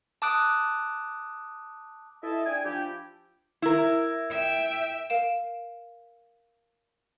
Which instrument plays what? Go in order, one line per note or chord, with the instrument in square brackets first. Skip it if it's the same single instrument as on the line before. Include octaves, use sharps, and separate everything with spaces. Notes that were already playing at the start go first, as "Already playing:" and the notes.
[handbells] A5 D6 D#6 F#6 D7
[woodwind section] E4 A4 D#5 E5 A5
D4 G5 G#5
F3 D4 E4 G4
[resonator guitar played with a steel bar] E4 A#4
[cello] E5 G5
[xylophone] A#4 F5 D7 E7